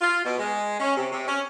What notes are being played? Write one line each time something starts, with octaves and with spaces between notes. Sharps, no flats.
F4
B2
G#3
C#4
C3
C3
C#4